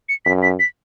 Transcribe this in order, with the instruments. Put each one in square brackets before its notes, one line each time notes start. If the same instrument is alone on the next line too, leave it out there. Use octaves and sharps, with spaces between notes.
[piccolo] C#7
[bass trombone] F#2 [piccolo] B6
[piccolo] B6
B6